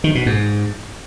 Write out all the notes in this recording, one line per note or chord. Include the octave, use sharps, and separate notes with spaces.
D#3
B2
G#2